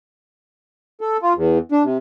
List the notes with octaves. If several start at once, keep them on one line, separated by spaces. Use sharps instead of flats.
A4
F4
E2
D4
C3